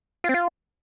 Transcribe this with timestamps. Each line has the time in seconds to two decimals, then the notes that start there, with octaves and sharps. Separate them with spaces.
0.24 F4
0.29 C4
0.34 F4